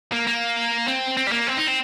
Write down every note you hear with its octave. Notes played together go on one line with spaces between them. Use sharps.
A#3
A#3
C4
C4
G3
A#3
C4
D#4
C4